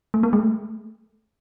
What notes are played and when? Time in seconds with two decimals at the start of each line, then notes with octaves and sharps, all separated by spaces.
0.14 A3
0.23 A#3
0.33 G#3
0.39 A3